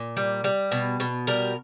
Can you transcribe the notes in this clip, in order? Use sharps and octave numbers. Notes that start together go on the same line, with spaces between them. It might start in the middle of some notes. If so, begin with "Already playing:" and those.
Already playing: A#2
G3
G3
B2
B2
G3 A#4